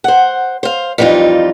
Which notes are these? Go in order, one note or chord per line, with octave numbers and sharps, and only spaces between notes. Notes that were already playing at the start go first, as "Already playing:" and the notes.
C5 F#5
C5 F5
F2 E3 G3 D#4 F4